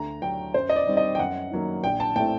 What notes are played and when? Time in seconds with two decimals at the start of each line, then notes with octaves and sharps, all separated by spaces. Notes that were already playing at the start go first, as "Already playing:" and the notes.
Already playing: D2 A#5
0.22 D3 F#3 G5
0.54 F#2 C5
0.69 D#5
0.76 D5
0.87 D#3 G3 C4
0.97 D#5
1.15 G5
1.19 F#2 F#5
1.51 D#3 F#3 A#3
1.84 A#1 G5
2.00 A5
2.16 A2 A3 C4 G5